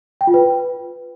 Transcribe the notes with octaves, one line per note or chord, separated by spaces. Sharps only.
G5
F4
B4